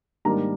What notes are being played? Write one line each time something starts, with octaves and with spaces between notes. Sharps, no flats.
G#2 D#3 G3 A#3 D4 A#5